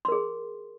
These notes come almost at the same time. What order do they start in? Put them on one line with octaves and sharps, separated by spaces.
C6 A#4 G#4